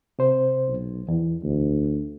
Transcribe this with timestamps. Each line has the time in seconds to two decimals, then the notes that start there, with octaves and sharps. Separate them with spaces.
0.19 C3 C5
0.68 B1
1.08 E2 E3
1.43 D2